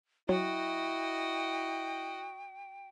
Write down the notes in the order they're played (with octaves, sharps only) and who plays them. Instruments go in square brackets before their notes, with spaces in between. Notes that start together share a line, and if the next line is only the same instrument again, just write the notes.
[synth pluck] F#3 [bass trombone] E4 [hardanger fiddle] F#4 D#5 [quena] G5